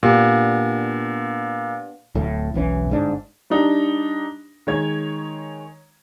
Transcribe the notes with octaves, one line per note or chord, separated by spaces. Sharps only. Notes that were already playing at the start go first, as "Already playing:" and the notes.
A#2 B3 D4 G4
D1 A2
E1 B1 E3 C#4
G1 G#2 D4
G3 D4 D#4 G4
D#3 G#3 C#5 G#6